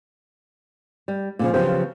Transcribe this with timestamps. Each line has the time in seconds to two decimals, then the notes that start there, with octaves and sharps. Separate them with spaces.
1.08 G3
1.39 A#2 C#3 F3
1.54 C#3 F3 F#3 B3 G4 C5